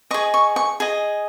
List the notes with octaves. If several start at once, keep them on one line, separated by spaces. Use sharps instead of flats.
G#4 D#5 C#6
C#6
C#6
G#4 D#5